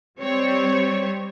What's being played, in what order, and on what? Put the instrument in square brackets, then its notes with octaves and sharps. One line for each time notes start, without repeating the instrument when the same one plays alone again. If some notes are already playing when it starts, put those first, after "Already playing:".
[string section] G3 C4 C#5